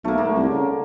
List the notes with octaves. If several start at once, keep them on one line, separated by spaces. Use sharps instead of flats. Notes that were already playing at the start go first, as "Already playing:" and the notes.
B1 A3 A#3
G#2 D3 A#3
C2
C#3